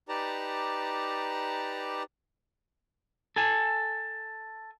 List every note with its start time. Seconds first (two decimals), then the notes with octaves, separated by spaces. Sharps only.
0.09 D#4 G4 B4 D5 A5 A#5
3.36 A4 G#5